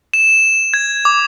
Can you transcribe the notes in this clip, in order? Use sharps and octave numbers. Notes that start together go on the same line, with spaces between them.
E7
G#6
D6